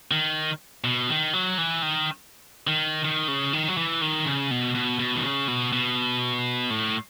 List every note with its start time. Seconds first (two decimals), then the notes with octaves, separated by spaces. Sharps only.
0.11 D#3
0.84 B2
1.09 D#3
1.33 F#3
1.58 E3
1.82 D#3
2.67 D#3
3.05 D#3
3.28 C#3
3.53 D#3
3.68 F#3
3.77 E3
4.02 D#3
4.26 C#3
4.51 B2
4.75 B2
4.99 B2
5.16 D#3
5.23 C#3
5.48 B2
5.72 B2
6.70 A2